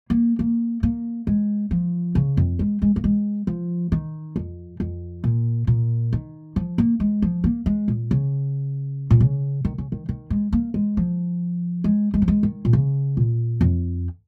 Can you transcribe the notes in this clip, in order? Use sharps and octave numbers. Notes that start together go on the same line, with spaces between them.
A#3
A#3
A#3
G#3
F3
C#3
F2
G#3
G#3
A#3
G#3
F3
D#3
F2
F2
A#2
A#2
D#3
F3
A#3
G#3
F3
A#3
G#3
A#2
C#3
A#2
C#3
D#3
C#3
D#3
D#3
G#3
A#3
G#3
F3
G#3
G#3
F3
G#3
D#3
A#2
C#3
A#2
F2